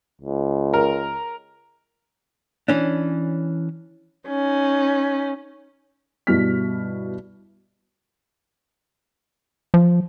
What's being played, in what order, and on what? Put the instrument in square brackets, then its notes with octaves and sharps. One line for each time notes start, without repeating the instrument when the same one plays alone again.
[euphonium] C#2
[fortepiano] A#4
[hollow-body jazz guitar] E3 C#4 D4
[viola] C#4 D#4
[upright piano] G2 B2 E4 F6 B6
[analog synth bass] F3